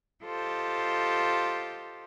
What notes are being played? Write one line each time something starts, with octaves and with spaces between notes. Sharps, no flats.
F4 G4 A4 C5 D#5